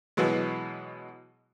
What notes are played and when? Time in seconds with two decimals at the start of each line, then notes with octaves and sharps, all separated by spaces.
0.17 B2 E3 F#3 G#3